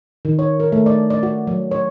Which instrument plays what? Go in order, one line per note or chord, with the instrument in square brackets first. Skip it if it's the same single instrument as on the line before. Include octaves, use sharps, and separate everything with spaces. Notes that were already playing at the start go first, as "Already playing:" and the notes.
[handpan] D#3
C#5
A#4
A3
D5
D5
F#4
F#3
C#5